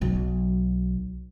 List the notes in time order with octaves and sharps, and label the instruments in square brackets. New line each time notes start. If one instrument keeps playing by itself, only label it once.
[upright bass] B1 F#3